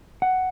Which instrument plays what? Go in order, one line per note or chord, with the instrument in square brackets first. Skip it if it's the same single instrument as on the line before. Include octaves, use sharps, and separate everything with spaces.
[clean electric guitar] F#5